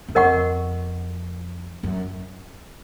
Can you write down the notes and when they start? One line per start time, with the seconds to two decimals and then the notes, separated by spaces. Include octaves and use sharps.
0.08 F#2
0.15 F2 A#4 D#5 F#5 C#6
1.83 F#2